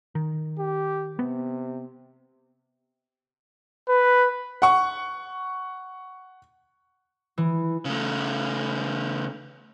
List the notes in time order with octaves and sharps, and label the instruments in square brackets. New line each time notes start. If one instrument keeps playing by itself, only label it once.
[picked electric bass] D#3
[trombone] G4
[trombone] C3 [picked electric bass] B3
[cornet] B4
[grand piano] F#5 C#6
[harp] E3
[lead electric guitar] C#3 A3